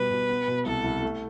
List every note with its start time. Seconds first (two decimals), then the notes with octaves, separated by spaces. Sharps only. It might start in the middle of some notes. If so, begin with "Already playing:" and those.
Already playing: B2 G3 B3 B4
0.10 B2
0.29 B3
0.48 B2
0.66 C2 A4
0.84 C2
1.02 A3